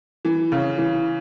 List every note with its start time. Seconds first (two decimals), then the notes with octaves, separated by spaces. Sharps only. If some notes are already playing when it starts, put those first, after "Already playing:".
0.25 E3
0.52 C#3
0.78 E3